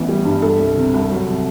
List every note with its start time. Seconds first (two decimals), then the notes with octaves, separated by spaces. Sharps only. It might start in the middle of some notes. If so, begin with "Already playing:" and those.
Already playing: A1 E3 B3
0.09 G3
0.25 G2
0.42 G3 A4
0.59 C2
0.77 C3
0.94 C2
1.10 F#3
1.28 C3